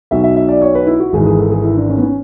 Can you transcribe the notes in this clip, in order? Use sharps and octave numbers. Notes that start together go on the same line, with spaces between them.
B1 B2 F#3 E5
E5
E5
D5
C#5
B4
E4
F#4
G#1 G#2 E3 G#4
G#4
A4
G#4
E4
D4
C#4
B3
C#4